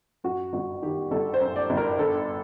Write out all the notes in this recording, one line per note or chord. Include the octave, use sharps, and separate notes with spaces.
F#2 F#4
G1 F#4
D#3 G4
G1 A4
C5
F#2
D5
G1
A#4
D3 A4